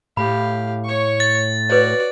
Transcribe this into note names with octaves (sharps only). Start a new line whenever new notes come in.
A2 G4 F5 B5
C#5 C#6
A6
F#4 B4 C#5 D5